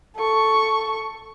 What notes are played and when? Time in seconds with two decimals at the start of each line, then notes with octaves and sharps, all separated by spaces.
0.15 A4 C#6